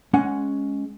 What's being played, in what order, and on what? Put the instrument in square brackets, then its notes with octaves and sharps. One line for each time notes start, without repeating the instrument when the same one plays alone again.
[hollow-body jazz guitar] G#3 C#4 F#5